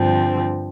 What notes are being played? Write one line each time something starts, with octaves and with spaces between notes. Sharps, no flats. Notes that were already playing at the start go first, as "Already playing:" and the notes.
Already playing: G2 D3 F3 C4